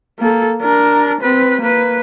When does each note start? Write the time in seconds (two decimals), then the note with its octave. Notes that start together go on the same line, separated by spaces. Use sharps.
0.19 A#3 A4
0.62 D4 A#4
1.21 C4 B4
1.61 A#3 B4